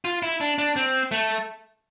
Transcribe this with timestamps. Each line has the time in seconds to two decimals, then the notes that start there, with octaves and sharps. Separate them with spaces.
0.05 F4
0.23 E4
0.41 D4
0.58 D4
0.76 C4
1.11 A3